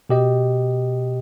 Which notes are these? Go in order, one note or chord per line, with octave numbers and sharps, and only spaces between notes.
B2 G4 D#5